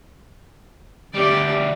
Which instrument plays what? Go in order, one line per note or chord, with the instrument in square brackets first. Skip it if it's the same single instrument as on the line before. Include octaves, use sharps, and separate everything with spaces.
[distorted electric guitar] D2 G3 [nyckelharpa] G4 D5